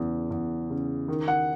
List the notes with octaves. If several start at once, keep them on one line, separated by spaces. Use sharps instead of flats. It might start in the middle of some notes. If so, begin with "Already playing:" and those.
Already playing: E2 C#3
E2
C#3
D#3
F#5